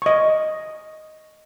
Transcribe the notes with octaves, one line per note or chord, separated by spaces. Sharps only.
D#5 C#6